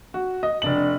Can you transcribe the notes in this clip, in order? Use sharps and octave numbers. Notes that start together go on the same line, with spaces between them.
F#4
D#5
F1 D4 F#7